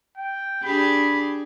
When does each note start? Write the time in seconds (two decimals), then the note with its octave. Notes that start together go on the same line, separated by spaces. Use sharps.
0.17 G5
0.64 D4 G4 G#4 B5